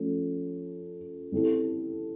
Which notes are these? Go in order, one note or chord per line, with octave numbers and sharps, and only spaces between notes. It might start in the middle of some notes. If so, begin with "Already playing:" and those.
Already playing: F3 A3 C#4
G3 C4 E4 A4